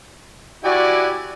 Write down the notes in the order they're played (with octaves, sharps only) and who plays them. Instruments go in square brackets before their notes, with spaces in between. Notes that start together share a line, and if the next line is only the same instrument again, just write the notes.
[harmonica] E4 G4 G#5 [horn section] F#4 D5